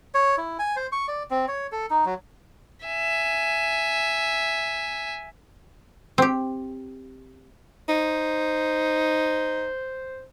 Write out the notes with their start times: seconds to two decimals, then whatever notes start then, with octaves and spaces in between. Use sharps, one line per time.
0.15 C#5
0.38 E4
0.59 G#5
0.76 C5
0.92 C#6
1.08 D5
1.31 C4
1.48 C#5
1.72 A4
1.90 D#4
2.05 F#3
2.86 E5 G#5
6.18 C4 G4
7.89 D#4 C5